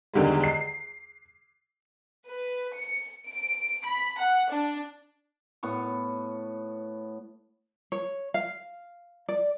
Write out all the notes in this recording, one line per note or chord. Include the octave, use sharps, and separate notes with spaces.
E2 D3 D#3 G3 G#3
C7
B4
C#7
D7
B5
F#5
D4
A2 B3 F#5 C#6
C#5
F5
D5